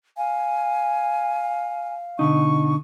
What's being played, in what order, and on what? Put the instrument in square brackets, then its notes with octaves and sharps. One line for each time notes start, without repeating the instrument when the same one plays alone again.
[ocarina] F5 [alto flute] G#5
[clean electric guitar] B2 D3 D#4 [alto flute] C#6